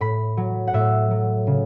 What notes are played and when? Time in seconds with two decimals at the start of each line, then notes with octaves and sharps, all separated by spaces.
0.01 A2 B5
0.37 F#3
0.67 F#5
0.73 A2 E5
1.11 F#3
1.47 C#3